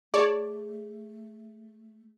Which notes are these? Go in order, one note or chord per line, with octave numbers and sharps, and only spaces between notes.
A3 G#4 C#5 D5 A5